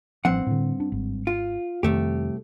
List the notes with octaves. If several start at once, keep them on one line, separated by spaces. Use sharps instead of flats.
A1 G2 F3 C4 F#5
A2 D3
D4
G#1
F4
C2 F2 D#3 A3 G4